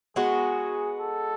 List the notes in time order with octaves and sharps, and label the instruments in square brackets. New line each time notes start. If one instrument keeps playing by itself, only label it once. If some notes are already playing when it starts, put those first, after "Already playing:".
[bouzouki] G#3 B3 F#4 [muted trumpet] G#4
[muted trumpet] A4